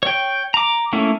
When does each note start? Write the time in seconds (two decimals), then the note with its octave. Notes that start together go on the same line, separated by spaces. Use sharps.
0.03 C#5 G5
0.54 A#5 D6
0.93 A3 A#3 C#4 E4